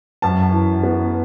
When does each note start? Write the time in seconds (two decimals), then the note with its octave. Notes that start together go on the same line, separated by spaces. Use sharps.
0.22 F#2 A5
0.53 E3
0.83 B3